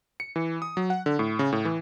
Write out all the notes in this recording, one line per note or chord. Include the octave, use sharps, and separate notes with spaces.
C#7
E3
D#6
F#3
F#5
D3
A2
C#3
A2
E3